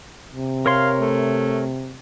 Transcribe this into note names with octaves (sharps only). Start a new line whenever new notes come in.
C3
A#4 C#5 F5 C6
A3